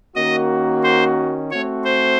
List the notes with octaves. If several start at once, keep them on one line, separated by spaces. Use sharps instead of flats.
D#3 A#3 C#4 F#4 D#5
C5
A3 C4 F#4 C#5
C5